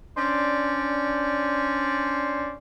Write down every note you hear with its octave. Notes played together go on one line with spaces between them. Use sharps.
C#4 D4 C5 D5